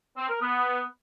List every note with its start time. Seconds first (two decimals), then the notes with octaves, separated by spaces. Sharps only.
0.17 C4
0.29 A#4
0.41 B3